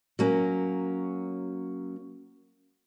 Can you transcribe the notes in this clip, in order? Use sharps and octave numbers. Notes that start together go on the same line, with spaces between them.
F#3 A#3 C#4